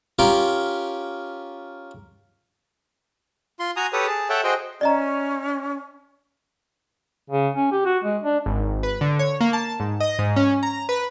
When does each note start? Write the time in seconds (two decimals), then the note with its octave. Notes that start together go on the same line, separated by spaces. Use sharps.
0.19 C#4 F4 G4 A#4
3.60 F4 C6
3.76 F#4 G#5 A#5 D#6
3.93 G4 A4 B4 C#5 D#6
4.07 G#4 A5
4.29 A4 C#5 E5 F#5 G5 A5
4.44 F#4 G#4 C5 D#5 G5
4.81 C#4 D5 D#5 A#5
7.30 C#3
7.55 C#4
7.72 G4
7.85 F#4
8.04 G#3
8.23 D4
8.46 G#1
8.83 B4
9.01 D3
9.19 C#5
9.41 A#3
9.53 A5
9.80 G#2
10.00 D#5
10.19 G#2
10.36 C#4
10.63 A#5
10.89 B4